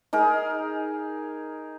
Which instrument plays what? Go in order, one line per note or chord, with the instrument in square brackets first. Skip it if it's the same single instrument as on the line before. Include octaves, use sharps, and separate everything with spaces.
[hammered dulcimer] D#4 G#4 A#4